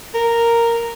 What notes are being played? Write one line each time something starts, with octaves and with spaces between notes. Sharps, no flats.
A#4